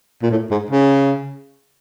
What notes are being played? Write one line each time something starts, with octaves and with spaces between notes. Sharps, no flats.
A#2
A2
G#2
C#3